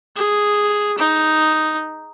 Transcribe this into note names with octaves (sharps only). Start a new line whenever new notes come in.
G#4
D#4